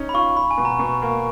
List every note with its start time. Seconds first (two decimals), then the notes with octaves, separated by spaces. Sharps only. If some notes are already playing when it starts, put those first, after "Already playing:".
Already playing: C#4 D#4
0.09 B5
0.14 F4 C#6
0.36 F4 B5
0.51 G#5
0.58 B2
0.65 A#5
0.79 B2
1.02 A#3